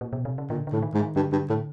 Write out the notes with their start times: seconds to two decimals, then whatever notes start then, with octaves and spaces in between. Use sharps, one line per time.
0.01 A#2
0.13 B2
0.25 C3
0.38 C#3
0.50 A#2 D3
0.67 D3
0.72 A2
0.82 D#3
0.94 G#2
1.00 D#3
1.16 G2 D3
1.32 G2
1.49 A2